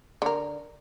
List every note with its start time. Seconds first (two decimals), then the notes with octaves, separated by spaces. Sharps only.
0.22 D3 A#4